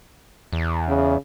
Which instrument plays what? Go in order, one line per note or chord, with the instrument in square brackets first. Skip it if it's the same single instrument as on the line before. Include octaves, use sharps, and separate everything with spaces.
[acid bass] E2
[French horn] C#3